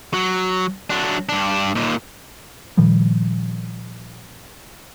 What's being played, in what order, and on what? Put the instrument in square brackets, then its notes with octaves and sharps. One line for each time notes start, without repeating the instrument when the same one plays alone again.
[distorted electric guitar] F#3
F#3 D4
G2 D4
D#2 A#2
[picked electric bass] A#2 D#3 F3 G3